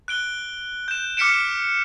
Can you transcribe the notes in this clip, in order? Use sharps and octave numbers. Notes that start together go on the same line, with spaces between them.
F#6 D7 G7
G6 E7
D6 F6 B6 C#7 D7 E7